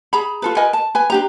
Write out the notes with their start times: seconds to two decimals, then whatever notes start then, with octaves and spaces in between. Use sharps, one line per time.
0.13 G#4 A#5 B5
0.42 F4 A4 B4
0.57 A#4 B4 D#5 G#5
0.73 A5
0.95 B4 G#5
1.10 D4 G4 A#5